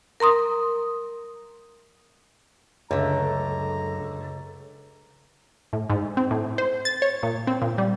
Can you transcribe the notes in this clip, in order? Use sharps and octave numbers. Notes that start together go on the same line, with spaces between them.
A#4 A#5 C6 D#6
C#2 F#2 D3 A3 A#5
A2
G#2
C4
A2
C5
A6
C#5
A#2
C4
A#2
G3